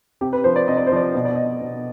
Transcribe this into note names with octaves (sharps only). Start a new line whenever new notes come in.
C3 G4
B4
F3 C5
D5
C3 D#5
D5
C5
F3 D5
B2 D#5
D5
D#5
B2